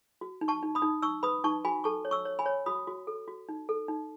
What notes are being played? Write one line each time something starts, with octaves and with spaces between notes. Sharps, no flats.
F#4
D#4
A5 C#6
D#4
B5 D#6
D#4
D#4 C#6 E6
B4 B5 D#6
D#4 A5 C#6
F#4 G#5 B5
A4 A5 C#6
C#5
C#6 E6
C#5
G#5 B5
C#5
F#4 B5 D#6
F#4
A4
F#4
D#4
A4
D#4